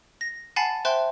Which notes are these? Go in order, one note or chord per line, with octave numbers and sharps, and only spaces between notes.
A#6
F#5 G#5 A5 B5 A6 C7
C5 E5 G5 A5 C6 F#6